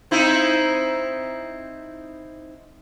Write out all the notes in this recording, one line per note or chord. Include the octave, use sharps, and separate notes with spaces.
C4 D#4 E4